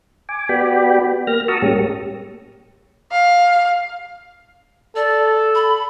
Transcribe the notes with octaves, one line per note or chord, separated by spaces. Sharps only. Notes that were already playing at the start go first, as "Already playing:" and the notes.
G#5 D6
B3 F#4 G4 D5 G5 B5
A#3 F6 A#6
F#4 A5 A#5 C#6 D#6 E6
A2 G3 G#3 A#3 C#4 G4
F5
A4 D5
B5